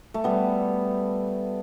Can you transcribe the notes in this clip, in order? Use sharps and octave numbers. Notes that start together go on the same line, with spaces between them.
A3
G3 B3